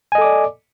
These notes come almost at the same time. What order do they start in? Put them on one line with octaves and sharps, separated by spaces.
G#5 D#5 A4 D6 D5